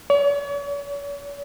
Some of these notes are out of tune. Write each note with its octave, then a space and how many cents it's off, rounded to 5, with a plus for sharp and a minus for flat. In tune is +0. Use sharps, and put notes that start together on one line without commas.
C#5 +40